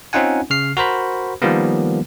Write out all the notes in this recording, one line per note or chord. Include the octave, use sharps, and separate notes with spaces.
C4 C#4 D#4 F4 F#5 G#5
C#3 F6 C7
F#4 A#4 C5 B5
D#3 F3 G3 A#3 B3